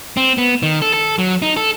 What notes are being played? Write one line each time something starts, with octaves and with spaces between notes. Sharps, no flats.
C4
B3
D#3
A4
A4
F#3
D#4
A4